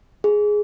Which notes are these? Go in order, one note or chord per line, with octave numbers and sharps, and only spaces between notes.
G#4